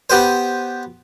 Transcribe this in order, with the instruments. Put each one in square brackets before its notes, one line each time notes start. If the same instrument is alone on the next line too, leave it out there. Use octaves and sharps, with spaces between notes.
[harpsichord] B3 G4 B4 C5